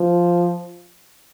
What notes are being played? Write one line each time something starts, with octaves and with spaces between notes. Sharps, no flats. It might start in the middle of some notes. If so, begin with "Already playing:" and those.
Already playing: F3